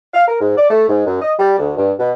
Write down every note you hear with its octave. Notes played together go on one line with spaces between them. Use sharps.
F5
A#4
G#2
D5
A3
G#2
F#2
D#5
G3
D2
G2
B2